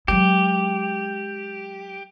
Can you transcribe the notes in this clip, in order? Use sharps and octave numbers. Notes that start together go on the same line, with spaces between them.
F#3 G#3 G4